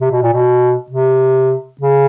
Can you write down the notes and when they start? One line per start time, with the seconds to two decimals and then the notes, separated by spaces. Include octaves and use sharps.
0.01 C3
0.11 B2
0.23 A#2
0.33 B2
0.90 C3
1.81 C#3